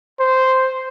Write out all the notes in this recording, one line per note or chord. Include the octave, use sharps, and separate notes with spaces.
C5